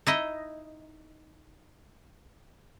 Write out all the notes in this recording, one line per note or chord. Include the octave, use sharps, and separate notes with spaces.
D#4 E4 D#5